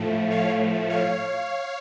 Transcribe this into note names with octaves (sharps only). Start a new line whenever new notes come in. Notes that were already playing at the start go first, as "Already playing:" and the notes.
Already playing: A2 F3 A3
C#5 F5
C#5 F5